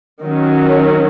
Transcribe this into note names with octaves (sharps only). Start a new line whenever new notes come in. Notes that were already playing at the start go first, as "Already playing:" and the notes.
D#3 F#3 C#4